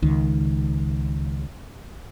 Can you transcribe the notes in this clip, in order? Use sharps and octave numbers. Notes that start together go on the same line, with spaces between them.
C#2 D#3